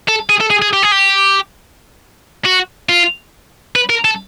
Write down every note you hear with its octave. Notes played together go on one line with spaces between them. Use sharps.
A4
G#4
A4
G#4
G#4
G4
G#4
G4
F#4
F4
B4
A#4
A4